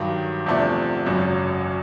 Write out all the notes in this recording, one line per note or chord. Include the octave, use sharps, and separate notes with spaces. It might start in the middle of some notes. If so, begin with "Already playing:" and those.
Already playing: G2 D#3 F#3
E2 C3 F3 A3 D4
G#1 F#2 C#3 F#3